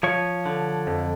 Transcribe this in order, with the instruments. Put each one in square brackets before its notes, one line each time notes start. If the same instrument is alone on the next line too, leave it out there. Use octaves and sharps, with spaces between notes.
[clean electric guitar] F3 C#5
D3
F2